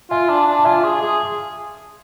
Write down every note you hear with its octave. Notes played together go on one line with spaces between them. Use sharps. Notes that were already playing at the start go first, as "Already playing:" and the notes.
F4 E5 G#5
D4
D4
A5
F4 E5 G#5
G#4
G#4